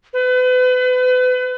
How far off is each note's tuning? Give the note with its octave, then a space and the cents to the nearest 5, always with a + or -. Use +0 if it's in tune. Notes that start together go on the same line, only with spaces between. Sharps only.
B4 +35